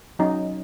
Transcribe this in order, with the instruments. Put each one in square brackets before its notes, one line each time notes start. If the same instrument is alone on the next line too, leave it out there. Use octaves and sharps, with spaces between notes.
[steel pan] F#3 C#4 D#4